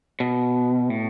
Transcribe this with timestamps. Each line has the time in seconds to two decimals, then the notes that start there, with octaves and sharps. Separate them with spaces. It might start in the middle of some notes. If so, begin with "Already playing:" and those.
0.20 B2
0.90 A2